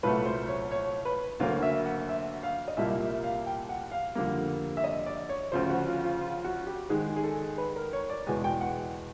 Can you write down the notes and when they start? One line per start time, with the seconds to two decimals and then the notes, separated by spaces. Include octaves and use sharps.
0.03 C2 A#2 F#3 A3 B4
0.26 C5
0.48 C#5
0.72 C#5
1.05 B4
1.40 D2 D3 F#3 A#3 F5
1.62 E5
1.86 F#5
2.09 E5
2.43 F5
2.68 D#5
2.77 C2 A#2 G3 A#3 E5
3.01 E5
3.24 F5
3.46 G5
3.69 F#5
3.92 F5
4.15 F2 D3 G3 A#3
4.77 E5
4.84 D#5
5.06 D5
5.29 C#5
5.52 D2 C#3 F3 C5
5.69 F#4
5.86 F4
6.04 F4
6.21 F4
6.44 F#4
6.67 G4
6.89 G#2 D#3 G#3 G#4
7.16 G#4
7.23 A4
7.58 B4
7.76 A#4
7.93 C#5
8.10 D5
8.27 E2 B2 G#3 G#5
8.44 G5
8.61 F#5